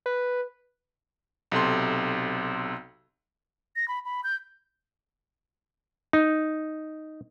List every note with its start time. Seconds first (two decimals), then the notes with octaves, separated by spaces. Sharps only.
0.06 B4
1.52 B1 C3 A4 C6
3.76 A#6
3.88 B5
4.05 B5
4.24 G6
6.13 D#4